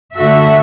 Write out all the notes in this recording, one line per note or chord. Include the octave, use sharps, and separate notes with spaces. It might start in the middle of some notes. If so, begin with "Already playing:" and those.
D3 A3 F#4 A4 E5